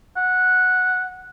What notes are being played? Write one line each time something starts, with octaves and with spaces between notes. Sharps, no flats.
F#5